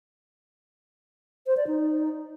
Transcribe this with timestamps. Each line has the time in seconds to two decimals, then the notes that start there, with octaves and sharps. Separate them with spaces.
1.47 C5
1.57 D5
1.67 D#4